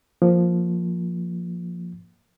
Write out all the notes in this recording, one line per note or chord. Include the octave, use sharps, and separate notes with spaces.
F3 A#3